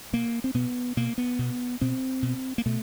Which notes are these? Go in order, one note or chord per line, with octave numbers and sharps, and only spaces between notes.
B2 A#3
C4
B2 B3
B2 A#3
B3
B2
B2 C4
B2
A#3
B2 A3